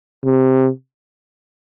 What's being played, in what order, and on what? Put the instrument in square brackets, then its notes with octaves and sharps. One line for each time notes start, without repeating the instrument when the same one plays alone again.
[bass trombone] C3